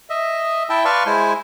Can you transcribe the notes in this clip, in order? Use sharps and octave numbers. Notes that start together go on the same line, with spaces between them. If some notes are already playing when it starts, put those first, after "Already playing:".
D#5 E5
E4 E5 G5 A5
B4 D5 F5 A5 C6 C#6
G#3 E4 C5 G#5